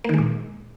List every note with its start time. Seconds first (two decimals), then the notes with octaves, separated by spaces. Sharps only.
0.04 A#3
0.09 D#3
0.14 G#3
0.18 A#2